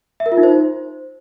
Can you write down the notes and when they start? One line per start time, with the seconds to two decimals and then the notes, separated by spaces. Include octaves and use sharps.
0.20 E5
0.26 A#4
0.32 F4
0.37 D#4
0.43 C5